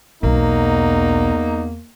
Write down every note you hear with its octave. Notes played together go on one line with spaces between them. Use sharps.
B1 E2 A#3 D#4